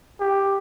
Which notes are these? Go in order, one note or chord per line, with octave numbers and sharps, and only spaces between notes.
G4